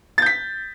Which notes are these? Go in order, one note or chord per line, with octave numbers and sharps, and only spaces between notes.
G6 A6 B6